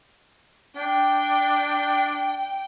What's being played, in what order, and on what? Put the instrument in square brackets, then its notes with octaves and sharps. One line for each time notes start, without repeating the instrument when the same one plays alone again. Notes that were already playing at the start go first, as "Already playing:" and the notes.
[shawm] D4 [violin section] G5